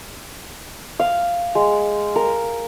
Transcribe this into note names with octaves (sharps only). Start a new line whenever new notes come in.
F5
G#3
A#4